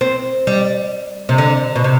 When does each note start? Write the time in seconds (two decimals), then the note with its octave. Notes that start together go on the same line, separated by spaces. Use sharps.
0.01 C4
0.47 G3
1.29 C3
1.38 D3
1.76 B2
1.84 C3